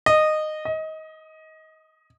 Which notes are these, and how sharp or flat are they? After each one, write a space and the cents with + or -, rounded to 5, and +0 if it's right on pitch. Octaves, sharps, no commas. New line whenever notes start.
D#5 -15
D#5 +20